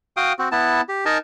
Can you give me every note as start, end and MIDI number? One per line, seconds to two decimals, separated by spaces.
0.17 0.33 66
0.17 0.33 77
0.17 0.33 79
0.17 0.33 87
0.39 0.48 60
0.39 0.48 66
0.52 0.81 59
0.52 0.81 64
0.52 0.81 81
0.89 1.05 67
1.06 1.18 63
1.06 1.18 70
1.06 1.18 75
1.06 1.18 80
1.06 1.18 81